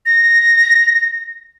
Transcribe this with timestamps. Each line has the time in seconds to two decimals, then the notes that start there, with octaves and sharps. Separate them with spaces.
0.06 A#6